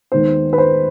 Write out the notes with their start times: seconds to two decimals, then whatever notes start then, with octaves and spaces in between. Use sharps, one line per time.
0.12 D#2 D#3 G#3 B3 C5
0.53 B4
0.58 C5